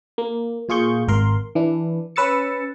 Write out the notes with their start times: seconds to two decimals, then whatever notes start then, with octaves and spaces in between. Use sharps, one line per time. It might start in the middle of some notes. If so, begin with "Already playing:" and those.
0.18 A#3
0.69 A#2 F4 G#4 C#6 G6
1.08 G#1 A#4 C6
1.55 E3 D4 E4
2.16 C#4 B4 E6 A6 C#7